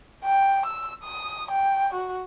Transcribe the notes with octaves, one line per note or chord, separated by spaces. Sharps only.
G5
E6
D#6
G5
F#4